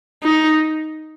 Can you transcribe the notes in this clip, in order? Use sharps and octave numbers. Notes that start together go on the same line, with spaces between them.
D#4